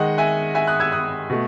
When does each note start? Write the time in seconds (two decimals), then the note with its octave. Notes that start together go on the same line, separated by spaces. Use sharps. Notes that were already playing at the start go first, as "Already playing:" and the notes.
Already playing: D#3 G#3 D#5 F#5
0.18 E5 G#5
0.55 E5 G#5
0.67 D#6 F#6
0.80 E6 G#6
0.92 D#6 F#6
1.30 B2 A3